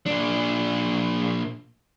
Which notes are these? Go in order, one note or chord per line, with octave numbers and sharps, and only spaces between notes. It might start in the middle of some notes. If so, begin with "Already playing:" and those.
A#2 D4